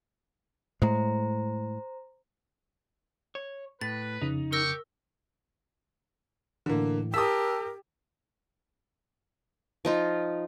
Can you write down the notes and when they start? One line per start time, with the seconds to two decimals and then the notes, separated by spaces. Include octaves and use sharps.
0.82 A2 G#3 C5 A#5
3.35 C#5
3.81 A2 B4 A6
4.21 F2 C#3 D#4
4.52 G4 A#4 C#6 E6 A#6
6.66 A2 D3 E3 A#3
7.14 G4 A#4 A5 D#6 E6 B6
9.85 F3 D#4 F4